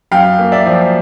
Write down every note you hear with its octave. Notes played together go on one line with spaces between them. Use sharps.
F#2 F5 G5
A#3
D5 E5
F3